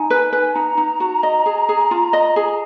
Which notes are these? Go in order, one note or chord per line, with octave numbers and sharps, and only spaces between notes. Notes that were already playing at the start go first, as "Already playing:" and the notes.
Already playing: D#4 G#5
B4
B4
D#4 A#5
D#4
F#4
D#5
G#4
G#4
F4
D#5
G#4